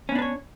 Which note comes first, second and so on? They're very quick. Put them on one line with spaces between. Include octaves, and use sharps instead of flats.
C#4 B3 D4 B4 C#5